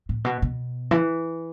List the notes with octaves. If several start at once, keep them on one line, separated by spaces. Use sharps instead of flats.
A2
B2
B2
E3